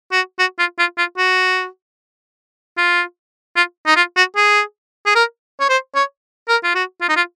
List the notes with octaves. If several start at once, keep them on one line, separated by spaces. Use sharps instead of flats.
F#4
F#4
F4
F4
F4
F#4
F4
F4
D#4
F4
F#4
G#4
G#4
A#4
C#5
C5
C#5
A#4
F4
F#4
F4
D#4
F4